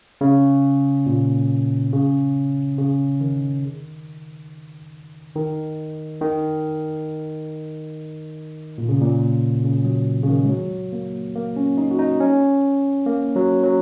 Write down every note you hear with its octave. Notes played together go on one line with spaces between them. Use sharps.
C#3
A#2
C#3
C#3
D#3
D#3
D#3
A#2
C#3
A#2
C#3
F#3
C#3
D#3
G#3
F#3
A#3
A#3
C#4
D#4
F#4
D#4
C#4
A#3
F#3
F#3